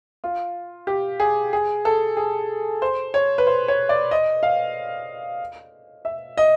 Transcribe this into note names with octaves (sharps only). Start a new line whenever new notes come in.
F4
G4
G#4
G#4
A4
G#4
C5
C#5
B4
C5
C#5
D5
D#5
F5
E5
D#5